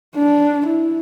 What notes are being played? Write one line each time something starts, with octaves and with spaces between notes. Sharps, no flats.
D4
E4